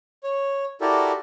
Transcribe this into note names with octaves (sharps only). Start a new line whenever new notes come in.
C#5
E4 F#4 G4 A4 A#4 D5